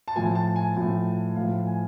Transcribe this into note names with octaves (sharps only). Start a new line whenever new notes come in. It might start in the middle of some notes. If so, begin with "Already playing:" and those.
A5
A2 F3 G#5
A5
G#5
A2 F3
A2 F3 F5
G#5